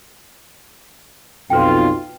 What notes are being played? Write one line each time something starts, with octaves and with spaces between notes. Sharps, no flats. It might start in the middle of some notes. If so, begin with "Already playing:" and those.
B1 F2 F4 B4 G5